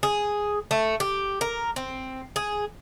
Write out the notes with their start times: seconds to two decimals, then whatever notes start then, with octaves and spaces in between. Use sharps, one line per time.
0.03 G#4
0.71 A3
1.00 G4
1.41 A#4
1.76 C4
2.36 G#4